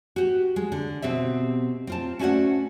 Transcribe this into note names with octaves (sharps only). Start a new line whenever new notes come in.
F#4 G4
G#3
D3
B2 C4 G4 E5
C4 F4 A5
A3 C#4 F#4 C5 D5 F#5